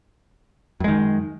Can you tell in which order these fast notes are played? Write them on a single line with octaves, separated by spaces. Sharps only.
F#2 G#3 D#3